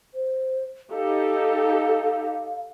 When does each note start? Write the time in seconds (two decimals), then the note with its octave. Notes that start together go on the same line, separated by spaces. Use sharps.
0.14 C5
0.91 D#4 G4 A4 F5